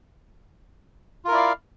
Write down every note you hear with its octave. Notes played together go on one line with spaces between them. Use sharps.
E4 F4 A#4 D5 F5